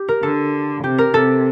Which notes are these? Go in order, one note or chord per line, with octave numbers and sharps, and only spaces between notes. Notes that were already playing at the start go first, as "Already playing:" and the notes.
Already playing: G4
A#4
D3 A4
C3 G4
A#4
C3 A4